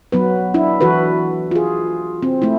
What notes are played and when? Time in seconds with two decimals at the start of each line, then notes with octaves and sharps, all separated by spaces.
0.12 F#3 B3 B4
0.54 D4 E4
0.81 E3 F#4 A4 B4
1.51 F4 G#4
2.23 C4
2.42 A3 E4